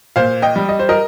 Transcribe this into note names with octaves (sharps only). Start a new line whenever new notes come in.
A#2 C5 F5
D#5 G5
G3
D#5
C5
A#4 D#5